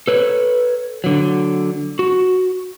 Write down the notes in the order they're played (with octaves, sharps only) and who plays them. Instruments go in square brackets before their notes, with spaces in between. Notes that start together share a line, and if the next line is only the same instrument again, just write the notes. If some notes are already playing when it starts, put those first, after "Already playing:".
[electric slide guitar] A4 B4 C#5
D3 F#3
F#4